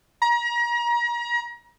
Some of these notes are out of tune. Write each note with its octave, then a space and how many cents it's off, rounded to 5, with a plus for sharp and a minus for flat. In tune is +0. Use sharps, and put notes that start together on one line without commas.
A#5 +35